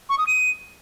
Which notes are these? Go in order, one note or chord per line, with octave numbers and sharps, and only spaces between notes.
C#6
D#6
D#7